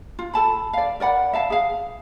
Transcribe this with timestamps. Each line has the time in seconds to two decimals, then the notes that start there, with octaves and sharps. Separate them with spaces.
0.19 F4
0.34 A4 A5 B5
0.73 D5 F5
1.00 A#4 D5 F#5 B5
1.33 E5 F5 A5
1.50 G#4 F5